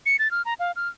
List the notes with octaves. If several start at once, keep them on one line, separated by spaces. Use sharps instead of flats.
C#7
A6
F6
A#5
F5
F6